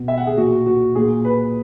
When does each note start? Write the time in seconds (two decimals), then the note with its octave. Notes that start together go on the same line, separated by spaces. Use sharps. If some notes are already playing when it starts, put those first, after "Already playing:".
Already playing: B2
0.08 E5
0.18 F#5
0.27 G#4
0.37 A#2 F#4
0.66 F#4
0.95 A#2 G#4
1.25 B4